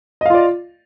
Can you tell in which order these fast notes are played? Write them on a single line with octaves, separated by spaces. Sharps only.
D#5 F5 F4 D5